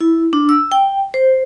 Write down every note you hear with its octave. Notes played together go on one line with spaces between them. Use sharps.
E4
D4
E6
G5
C5